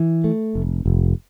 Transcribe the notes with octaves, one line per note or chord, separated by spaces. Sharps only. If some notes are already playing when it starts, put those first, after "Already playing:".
Already playing: E3
A3
F1
F1